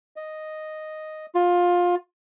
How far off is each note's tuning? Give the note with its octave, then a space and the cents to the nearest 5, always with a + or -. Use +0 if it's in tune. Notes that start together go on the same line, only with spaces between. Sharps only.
D#5 -5
F4 +20